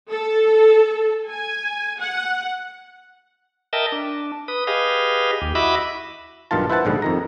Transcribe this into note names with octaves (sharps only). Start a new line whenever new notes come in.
A4
G#5
F#5
A#4 D#5 E5 G5 A5
D4
B4 D#6
G4 G#4 B4 D#5 F5
D#2 G4
E4 F#4 D#5 E5 B5 D6
B1 G2 D#3 F4 A5
E4 B4 C5 F#5 A5
A#1 G#2 D3 G3
F2 D#3 A#5